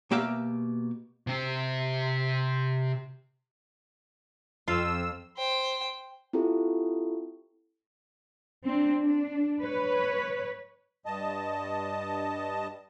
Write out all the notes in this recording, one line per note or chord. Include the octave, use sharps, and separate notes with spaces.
B2 A#3 G4 E5 F5
C3 C4
F2 F4 E6
C5 G5
C4 E4 F4 G4 A4
C4 D4
D4
B4 C#5
G2 D#5 A5